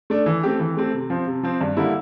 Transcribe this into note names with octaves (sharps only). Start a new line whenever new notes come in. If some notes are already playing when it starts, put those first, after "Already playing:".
A3 D4
E3
A3 C4 G4
E3
A3 C4 G4
C3
F3 C4
C3
F3 C4
G2
D3 G3 A#3 E4